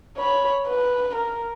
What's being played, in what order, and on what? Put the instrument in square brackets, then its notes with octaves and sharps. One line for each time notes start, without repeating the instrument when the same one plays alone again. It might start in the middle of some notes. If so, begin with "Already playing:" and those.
[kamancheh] C#5 B5
B4
A#4